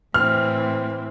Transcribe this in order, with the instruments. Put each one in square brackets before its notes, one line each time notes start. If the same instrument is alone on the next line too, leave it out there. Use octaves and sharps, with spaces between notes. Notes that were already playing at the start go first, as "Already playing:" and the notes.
[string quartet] A2 E3 C4 [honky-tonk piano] F6